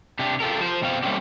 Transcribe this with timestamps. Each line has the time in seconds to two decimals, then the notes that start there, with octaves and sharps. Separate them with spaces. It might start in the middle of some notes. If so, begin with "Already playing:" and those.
0.19 C3 D4 G4
0.40 F4 G4 A4 A#4
0.61 F3 C5
0.82 B2 C4 F5
1.03 G3 A3 A#3 C4 C#4 G4